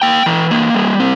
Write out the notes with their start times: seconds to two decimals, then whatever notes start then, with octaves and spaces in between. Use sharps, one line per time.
0.02 A#3 G5
0.26 E3
0.51 A#3
0.74 G3
1.00 C4